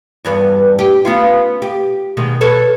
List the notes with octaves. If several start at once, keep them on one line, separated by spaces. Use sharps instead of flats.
E2 G2 B3
G4
B3 C#4 F4
G4
B2 D#3 G#3
A4 B4 C#5